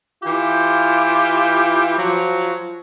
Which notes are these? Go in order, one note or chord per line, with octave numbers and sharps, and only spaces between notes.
E3 F4 G4 G5
F3 F#3